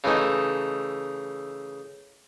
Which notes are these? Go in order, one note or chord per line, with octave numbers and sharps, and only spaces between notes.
C#3 E3 A3 D#4